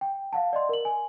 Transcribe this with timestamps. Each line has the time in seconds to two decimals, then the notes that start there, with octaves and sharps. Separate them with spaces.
0.01 G5
0.33 F5 F#5 A5
0.53 D5 D#5 C6
0.69 A#4 F#7
0.85 G#5